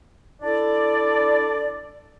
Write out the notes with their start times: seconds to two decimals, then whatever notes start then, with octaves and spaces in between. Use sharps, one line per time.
0.42 D4 E4 A4 D5